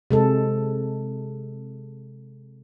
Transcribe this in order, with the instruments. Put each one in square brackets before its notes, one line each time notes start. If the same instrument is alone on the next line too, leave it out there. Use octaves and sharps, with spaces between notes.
[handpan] C3 G#3 A4